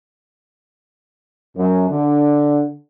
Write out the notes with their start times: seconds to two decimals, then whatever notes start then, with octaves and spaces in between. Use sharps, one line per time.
1.56 F#2
1.89 D3